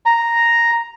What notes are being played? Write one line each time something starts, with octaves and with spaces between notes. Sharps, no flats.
A#5